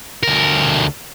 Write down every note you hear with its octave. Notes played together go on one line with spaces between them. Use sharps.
D2 A#4